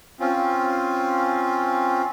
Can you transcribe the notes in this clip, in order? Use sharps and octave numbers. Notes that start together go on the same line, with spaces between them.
C4 C#4 F4